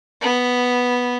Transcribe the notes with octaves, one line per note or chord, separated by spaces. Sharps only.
B3